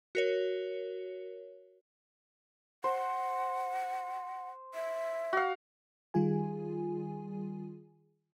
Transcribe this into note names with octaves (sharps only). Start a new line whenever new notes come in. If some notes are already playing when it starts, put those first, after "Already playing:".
F#4 A#4 C#5
C5 F#5
E5
F#4 F5
D#3 G3 F4 G#4 G#5